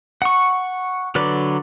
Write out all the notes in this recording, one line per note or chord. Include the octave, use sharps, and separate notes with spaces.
F#5 C#6
D3 F#3 B4 D5